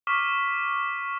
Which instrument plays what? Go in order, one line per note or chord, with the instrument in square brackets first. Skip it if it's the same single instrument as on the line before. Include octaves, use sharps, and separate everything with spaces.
[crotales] C#6 D6 F6 B6